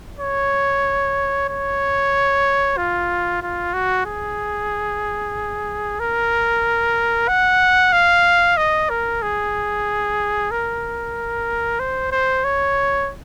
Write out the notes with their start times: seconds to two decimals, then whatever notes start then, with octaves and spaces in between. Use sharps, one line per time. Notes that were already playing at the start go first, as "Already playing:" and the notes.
0.20 C#5
1.49 C#5
2.77 F4
3.42 F4
3.74 F#4
4.06 G#4
6.00 A#4
7.28 F#5
7.93 F5
8.57 D#5
8.90 A#4
9.22 G#4
10.51 A#4
11.80 C5
12.12 C5
12.44 C#5